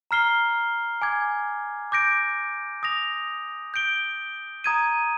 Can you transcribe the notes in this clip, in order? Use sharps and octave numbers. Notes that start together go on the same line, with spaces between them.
A#5 F6 C7 G7
G#5 D6 G#6
D6 G6 A#6 D7
D#6 A#6 F7
G6 D7 G7
A#5 D#6 G#6 D#7